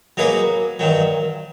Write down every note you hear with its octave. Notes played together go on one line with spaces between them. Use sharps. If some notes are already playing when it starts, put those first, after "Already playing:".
F#3 A#3 D#4 G#4 B4
G2 D#3 F#3